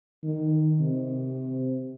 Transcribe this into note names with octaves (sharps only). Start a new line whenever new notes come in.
D#3
C3